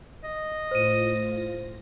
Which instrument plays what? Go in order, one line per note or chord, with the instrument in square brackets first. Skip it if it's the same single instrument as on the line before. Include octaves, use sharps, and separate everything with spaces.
[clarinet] D#5
[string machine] A2 F4 A#6 [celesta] C5 D#7